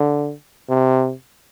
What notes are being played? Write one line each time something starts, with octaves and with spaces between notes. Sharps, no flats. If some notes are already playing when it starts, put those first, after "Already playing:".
Already playing: D3
C3